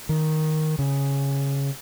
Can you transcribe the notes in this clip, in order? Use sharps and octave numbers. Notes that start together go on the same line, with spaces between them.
D#3
C#3